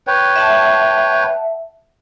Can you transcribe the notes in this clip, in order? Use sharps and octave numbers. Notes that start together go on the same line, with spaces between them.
B4 C#5 G5
E5 F#5 A5